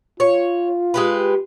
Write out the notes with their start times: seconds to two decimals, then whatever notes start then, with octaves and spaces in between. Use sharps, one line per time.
0.20 F4 C#5
0.94 G#3 G4 B4